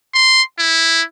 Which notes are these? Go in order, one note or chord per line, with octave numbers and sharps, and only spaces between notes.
C6
E4